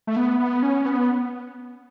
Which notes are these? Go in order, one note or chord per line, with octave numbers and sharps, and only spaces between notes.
A3
B3
B3
C#4
B3